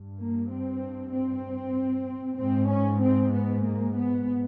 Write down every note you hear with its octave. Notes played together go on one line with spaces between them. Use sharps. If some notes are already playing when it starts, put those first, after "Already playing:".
Already playing: G2
A#3
C4
C4
G#2 C4
C#4
C4
B3
A#3
B3